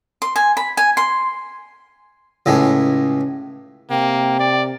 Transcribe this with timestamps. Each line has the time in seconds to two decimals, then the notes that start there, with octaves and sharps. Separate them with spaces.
0.22 C6
0.36 G#5
0.57 B5
0.77 G#5
0.97 C6
2.46 C#2 A2 G#3
3.91 C3 A#3 G5
4.40 D5